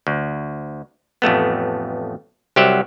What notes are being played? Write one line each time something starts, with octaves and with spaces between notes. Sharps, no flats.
D2
A1 F2 A3 B3
C2 F#3 G4 C5 E5 F#5